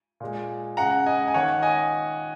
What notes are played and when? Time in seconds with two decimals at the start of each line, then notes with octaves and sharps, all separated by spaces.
0.20 A#2 G#3
0.77 C#3 G#3 F#5 A#5
1.06 D#5 G#5
1.28 G#5
1.34 D#3 A#3 C#5 F#5
1.62 D#5 G#5